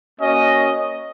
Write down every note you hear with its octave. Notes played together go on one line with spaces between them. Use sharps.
A#3 C#4 F#4 D#5